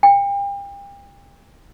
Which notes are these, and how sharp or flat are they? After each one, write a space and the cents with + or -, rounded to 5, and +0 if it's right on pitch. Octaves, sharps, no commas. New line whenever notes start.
G5 +35